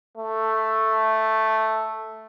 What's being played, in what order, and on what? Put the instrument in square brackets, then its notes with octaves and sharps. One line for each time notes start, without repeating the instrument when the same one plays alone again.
[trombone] A3